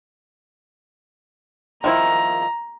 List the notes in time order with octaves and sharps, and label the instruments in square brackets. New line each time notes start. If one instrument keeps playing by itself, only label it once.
[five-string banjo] D#3 F3 E4 [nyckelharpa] A#5